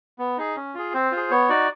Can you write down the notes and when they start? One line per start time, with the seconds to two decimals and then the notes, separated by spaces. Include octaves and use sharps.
0.19 B3
0.38 D#4 G#4
0.56 C#4
0.75 F4 G#4
0.94 C4 C5
1.12 F4 G#4
1.31 B3 C#5
1.49 D#4 F#4 D5